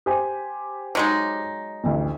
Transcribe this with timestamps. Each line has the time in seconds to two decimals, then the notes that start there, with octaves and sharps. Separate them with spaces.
0.06 G4 C5 G#5
0.95 F#3 G#3 D#4
1.84 A1 D2